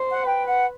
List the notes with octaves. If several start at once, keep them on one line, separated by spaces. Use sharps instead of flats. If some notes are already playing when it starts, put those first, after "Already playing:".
Already playing: C5
F#5
B4 G5
F#5